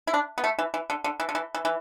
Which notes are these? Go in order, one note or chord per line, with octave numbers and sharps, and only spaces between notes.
E4
D4
B3
A3
E3
E3
D3
D3
E3
D3
E3
E3
E3